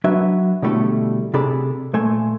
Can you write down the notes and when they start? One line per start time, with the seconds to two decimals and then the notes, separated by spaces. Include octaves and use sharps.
0.04 F#3 D4 F#4 B4 E5
0.62 B2 D3 G3 A3 E4 A4
1.34 C3 G#4 A4 D5 B5
1.93 A#2 A3 G#5 C6